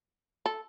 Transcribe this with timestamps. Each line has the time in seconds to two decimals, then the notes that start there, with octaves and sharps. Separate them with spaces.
0.46 A4